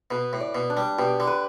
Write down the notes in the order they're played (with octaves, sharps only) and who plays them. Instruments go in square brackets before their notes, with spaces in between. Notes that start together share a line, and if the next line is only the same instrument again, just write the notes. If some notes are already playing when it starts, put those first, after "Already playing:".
[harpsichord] B2 [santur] B4
[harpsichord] A2
[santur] D5
[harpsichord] B2
[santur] D4
[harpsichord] G3
[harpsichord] B2 [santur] G4
[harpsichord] D3
[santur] B4